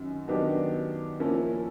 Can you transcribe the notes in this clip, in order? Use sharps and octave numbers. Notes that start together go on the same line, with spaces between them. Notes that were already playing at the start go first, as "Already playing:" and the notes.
Already playing: F#2 D#3
D#3 F#3 B3 D4 G4
F3 A#3 C#4 E4